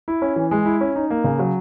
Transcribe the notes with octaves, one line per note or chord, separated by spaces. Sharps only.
E4
C#4
E3
G#3
E4
C#4
D#4
A#3
C#3
F#3